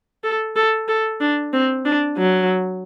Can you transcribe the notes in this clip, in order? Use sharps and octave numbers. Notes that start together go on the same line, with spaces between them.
A4
A4
A4
D4
C4
D4
F#3